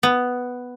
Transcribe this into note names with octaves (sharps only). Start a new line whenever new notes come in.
B3